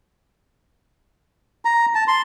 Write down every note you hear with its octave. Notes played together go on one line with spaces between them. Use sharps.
A#5
A5
C6